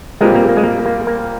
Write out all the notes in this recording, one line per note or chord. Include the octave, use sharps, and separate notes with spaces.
A#2 G3 G#3 C4 F4 A#4
A#3
A#3
G#3
A#3
A#3
A#3